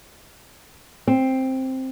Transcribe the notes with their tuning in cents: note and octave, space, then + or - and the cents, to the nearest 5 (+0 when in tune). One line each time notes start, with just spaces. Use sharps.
C4 +5